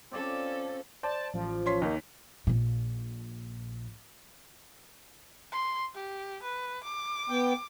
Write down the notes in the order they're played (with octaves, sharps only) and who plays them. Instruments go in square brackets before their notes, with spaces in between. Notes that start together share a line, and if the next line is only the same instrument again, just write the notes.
[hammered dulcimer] C4 F4 D5 [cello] C#4 A4
[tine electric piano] C5 [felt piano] D5 [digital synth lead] A5
[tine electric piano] A1 [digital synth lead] F3
[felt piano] C#4 C6 B6
[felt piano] D#2 [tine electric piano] A#3 D#4
[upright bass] A#1 A#2
[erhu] C6
G4
B4
D6
[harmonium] B3 G5